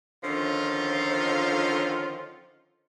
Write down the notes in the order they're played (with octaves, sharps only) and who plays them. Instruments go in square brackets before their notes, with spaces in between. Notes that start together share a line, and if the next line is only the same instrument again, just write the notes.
[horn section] D3 D#3 F3 C#4 F4